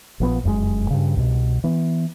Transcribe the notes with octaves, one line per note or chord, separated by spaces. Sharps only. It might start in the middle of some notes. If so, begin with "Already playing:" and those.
A#1 F3 B3
F1 F#2 B2 G#3
G2 C#3
C2 B2
E3 B3